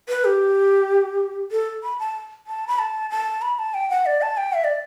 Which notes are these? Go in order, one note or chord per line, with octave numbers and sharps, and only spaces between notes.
B4
G4
A4
B5
A5
A5
B5
A5
A5
B5
A5
G5
F#5
D5
A5
G5
E5
D5